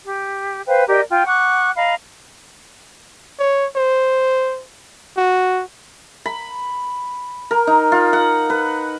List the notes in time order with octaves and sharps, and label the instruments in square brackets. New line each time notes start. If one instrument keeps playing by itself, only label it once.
[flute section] G4
B4 C5 F5 G5
G4 A#4 D5 D#5
F4 G5
F#5 C#6 D6 F#6
D#5 F5 A#5 B5
[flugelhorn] C#5
C5
F#4
[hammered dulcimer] B5
A#4
D#4
F4
F#5
B4